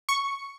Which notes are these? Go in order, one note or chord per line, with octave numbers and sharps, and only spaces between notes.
C#6